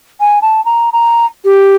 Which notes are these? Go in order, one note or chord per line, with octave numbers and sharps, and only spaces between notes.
G#5
A5
A#5
A#5
G4